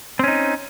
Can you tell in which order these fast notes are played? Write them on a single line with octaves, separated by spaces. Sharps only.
C4 C#4 D#4